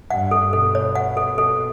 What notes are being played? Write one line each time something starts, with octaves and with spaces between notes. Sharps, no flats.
G2 F#5
A4
B2 A4
C#5
F#5
A4
A4